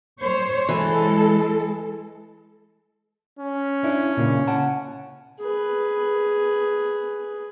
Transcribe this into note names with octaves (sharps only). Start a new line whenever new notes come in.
C5 C#5
E3 G#3 A4
C#4
D4 E4
A#2 C#3
F#5 A5
G#4 B4